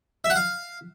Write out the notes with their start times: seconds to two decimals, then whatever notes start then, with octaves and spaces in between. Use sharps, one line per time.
0.24 E5
0.30 F#5
0.36 F5